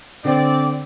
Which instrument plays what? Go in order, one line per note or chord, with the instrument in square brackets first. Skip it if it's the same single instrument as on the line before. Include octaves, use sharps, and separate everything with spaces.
[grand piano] D3 [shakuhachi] C4 [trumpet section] D5